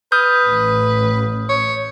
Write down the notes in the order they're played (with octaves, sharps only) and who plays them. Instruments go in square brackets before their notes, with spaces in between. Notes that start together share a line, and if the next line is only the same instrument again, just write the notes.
[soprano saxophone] B4 [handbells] D#6 F6 G6
[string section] A1
[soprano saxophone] C#5